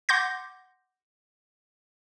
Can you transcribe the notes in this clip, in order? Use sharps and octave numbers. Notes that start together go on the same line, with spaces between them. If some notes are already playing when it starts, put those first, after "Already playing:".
F#5 C6 D6 G6 A#6